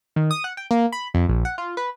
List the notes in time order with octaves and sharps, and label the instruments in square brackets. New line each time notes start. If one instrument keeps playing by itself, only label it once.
[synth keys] D#3
D#6
F#5
G5
A#3
B5
F2
A#1
F#5
F4
B4